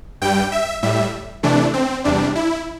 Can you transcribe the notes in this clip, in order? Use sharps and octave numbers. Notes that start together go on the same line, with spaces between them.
G2 G3 G5
E5
A2 G3 E5
C3 E3 A3 D4
C4
E2 C3 G3 D4
E4